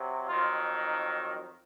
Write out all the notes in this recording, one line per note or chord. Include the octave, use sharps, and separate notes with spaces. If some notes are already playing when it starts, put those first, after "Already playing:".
Already playing: C3 F#3
F2 D#3 F#3 F4
D#4